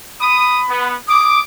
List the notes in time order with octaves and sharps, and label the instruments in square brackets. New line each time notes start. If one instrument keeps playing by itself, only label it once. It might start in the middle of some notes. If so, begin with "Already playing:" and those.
[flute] B5 [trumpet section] D#6
[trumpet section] B3
[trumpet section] D6 [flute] D#6